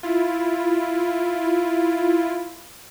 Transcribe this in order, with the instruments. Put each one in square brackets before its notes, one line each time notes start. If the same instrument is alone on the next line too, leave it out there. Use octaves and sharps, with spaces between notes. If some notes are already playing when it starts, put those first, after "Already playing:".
[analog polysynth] E4 F4